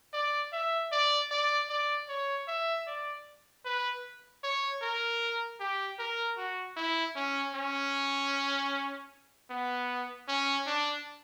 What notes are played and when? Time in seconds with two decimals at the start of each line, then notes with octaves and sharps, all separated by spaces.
0.14 D5
0.53 E5
0.92 D5
1.31 D5
1.69 D5
2.09 C#5
2.48 E5
2.87 D5
3.65 B4
4.44 C#5
4.82 A#4
5.60 G4
5.99 A#4
6.37 F#4
6.77 E4
7.15 C#4
7.55 C#4
9.50 B3
10.28 C#4
10.67 D4